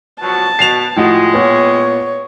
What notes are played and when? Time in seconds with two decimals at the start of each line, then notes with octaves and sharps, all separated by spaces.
0.22 B2 F3 F#3 A5
0.59 B2 C7 E7 F7
0.96 A2 F3 G3 G#3 F#4
1.34 A#2 B3 C#5